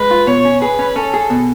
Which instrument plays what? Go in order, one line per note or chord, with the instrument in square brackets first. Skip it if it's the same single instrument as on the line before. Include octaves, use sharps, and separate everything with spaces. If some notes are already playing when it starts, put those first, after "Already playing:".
Already playing: [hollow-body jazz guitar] G#3 [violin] B4
[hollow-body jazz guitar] F4
[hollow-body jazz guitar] B2 [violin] C#5
[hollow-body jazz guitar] C#4
[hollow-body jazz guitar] G#4 [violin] B4
[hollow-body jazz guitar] C#4
[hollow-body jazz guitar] C#4 [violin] A4
[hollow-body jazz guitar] G#4
B2